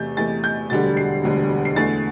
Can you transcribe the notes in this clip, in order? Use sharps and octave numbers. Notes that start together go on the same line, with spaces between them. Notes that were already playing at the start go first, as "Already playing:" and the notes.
Already playing: E2 C3 A3 G6 A6
E2 C3 A3 A6
G6
E1 D2 D3 G3 A6
C7
E1 D2 D3 G3
C7
E2 D3 A3 A6